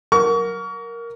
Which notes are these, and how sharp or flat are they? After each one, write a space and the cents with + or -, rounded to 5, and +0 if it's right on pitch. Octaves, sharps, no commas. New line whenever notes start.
A#4 +0 F#5 -20 C#6 +35